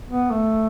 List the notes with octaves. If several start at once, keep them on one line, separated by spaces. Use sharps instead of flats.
B3
A3